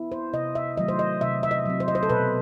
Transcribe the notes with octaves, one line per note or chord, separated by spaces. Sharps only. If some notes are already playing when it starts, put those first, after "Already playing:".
Already playing: B3 E4
C5
C3 D#5
E5
D#3 F#3 A3 D#5
C5
D#5
C3 E5
E5
D#5
F#3 C4
C5
D#5
C5
A4
B2 B4